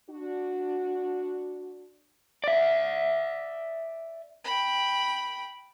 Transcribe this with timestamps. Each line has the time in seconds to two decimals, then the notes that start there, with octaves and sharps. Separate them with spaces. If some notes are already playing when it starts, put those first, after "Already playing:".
0.10 D4 F#4
2.44 D5 E5
4.44 G5 B5